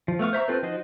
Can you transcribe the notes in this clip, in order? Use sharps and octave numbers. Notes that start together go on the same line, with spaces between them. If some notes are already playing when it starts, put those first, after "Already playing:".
F3
A3 B3 F5 C#6
C5 E5 A#5 C#6
C4 F4 A4 B4 C5
F3 D#4 F#4 C5 D#5